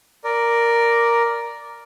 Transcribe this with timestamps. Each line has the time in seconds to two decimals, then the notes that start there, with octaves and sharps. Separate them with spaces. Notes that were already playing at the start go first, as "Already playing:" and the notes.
0.24 A#4 D5